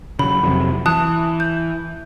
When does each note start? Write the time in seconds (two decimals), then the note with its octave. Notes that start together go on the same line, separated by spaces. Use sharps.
0.19 C#3 F#3 B5
0.43 F2 C3 F#3
0.86 E3 A5 D#6 F#6
1.40 G6